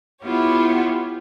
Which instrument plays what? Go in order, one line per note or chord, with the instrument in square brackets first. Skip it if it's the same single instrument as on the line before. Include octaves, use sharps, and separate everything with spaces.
[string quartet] B3 E4 F4 G4 C#5